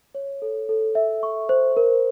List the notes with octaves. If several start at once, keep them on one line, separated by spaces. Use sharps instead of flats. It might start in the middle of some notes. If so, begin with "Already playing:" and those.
C#5
A4
A4
E5
C#6
C5
A#4